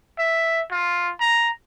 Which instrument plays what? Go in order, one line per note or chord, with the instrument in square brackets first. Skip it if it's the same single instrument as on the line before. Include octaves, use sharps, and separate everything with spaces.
[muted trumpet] E5
F4
A#5